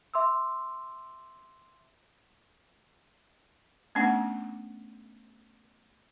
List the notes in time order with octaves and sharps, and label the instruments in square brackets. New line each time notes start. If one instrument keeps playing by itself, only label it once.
[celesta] E5 C6 D6 E6
[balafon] A3 B3 C#4 D4 F#5